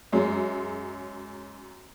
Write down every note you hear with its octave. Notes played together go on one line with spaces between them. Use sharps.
F#2 F#3 G#3